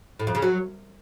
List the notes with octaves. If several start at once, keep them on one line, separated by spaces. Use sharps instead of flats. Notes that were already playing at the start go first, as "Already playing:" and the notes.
A2
F2
C#3
F#3